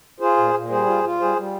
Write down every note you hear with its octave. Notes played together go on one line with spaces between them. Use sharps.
F4 G#4 C5
A#2
A#2
G3 G#4 C5
F4
F4
G3 G#4 C5
G3